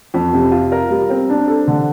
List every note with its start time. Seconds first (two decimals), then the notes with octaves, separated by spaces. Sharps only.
0.14 F2
0.33 C3
0.51 F4
0.72 A#4
0.90 G3
1.10 C4
1.30 D4
1.48 A4
1.68 D3